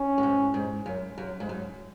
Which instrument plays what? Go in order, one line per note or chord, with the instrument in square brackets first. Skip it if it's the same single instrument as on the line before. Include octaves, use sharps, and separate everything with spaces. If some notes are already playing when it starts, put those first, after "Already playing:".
Already playing: [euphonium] C#4
[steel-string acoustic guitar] A2
G#2
G#2
F#2
F#2
G#2
F#2